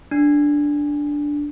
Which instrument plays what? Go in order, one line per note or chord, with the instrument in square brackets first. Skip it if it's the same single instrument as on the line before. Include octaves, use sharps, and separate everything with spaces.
[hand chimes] D4